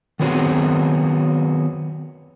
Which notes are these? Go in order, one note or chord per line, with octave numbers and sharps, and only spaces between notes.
D#3 F#3 B3 C4 F#4 G#4